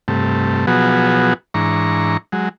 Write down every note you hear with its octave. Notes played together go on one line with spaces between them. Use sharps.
G2 C3 A3
B2 F3 F#3 B3 F#4 G#4
G#2 E3 D4 A#5 C#6
F#3 G#3